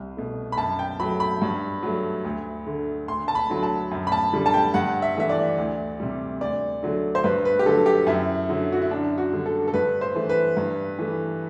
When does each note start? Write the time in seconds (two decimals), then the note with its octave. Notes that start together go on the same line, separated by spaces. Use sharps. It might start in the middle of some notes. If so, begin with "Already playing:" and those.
Already playing: C2
0.17 B2 A3
0.52 B5
0.58 F#2 A5
0.79 G5
1.00 F#3 A3 B5
1.20 B5
1.42 G2
1.83 F#3 A3
2.25 D2
2.66 D3 A3
3.08 D2 C6
3.28 A5
3.35 B5
3.50 D3 F#3 A3
3.63 A5
3.91 F#2
4.07 B5
4.12 A5
4.33 D3 G3
4.46 A5
4.54 G5
4.74 G2 F#5
5.02 E5
5.17 E3 A3 E5
5.29 D5
5.58 D2
6.00 C3 G3
6.41 D2 D5
6.83 D3 F#3 A3
7.15 C5
7.24 G2 B4
7.45 B4
7.59 G4
7.66 D3 F#3 A3 A4
7.86 G4
8.07 F#2 E4
8.49 D3 F#3
8.72 F#4
8.82 E4
8.91 F#2 D4
9.18 F#4
9.33 D3 G3
9.46 A4
9.68 A4
9.74 G2 B4
10.01 C5
10.15 E3 A3
10.29 B4
10.57 G2
10.99 E3 A3